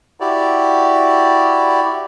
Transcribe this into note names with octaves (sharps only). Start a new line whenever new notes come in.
E4 F#4 G4 D5